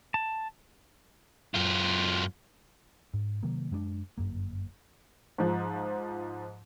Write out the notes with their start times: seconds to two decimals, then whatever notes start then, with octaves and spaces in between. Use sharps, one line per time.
0.14 A5
1.55 F#2 F4
3.14 G#2
3.43 C3 D#3 F#3 A#3
3.71 F#2 G#3 A#3 D4
4.18 G1 F#2 A#3
5.38 G#2 F3